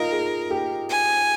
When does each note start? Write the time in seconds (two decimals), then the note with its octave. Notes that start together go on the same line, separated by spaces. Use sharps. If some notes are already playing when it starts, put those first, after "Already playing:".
Already playing: D#4 F4 A#4 D#5 F5
0.12 G#4
0.51 G4
0.89 G#5